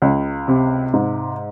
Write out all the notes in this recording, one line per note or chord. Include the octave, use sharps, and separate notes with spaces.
C#2
C3
G#2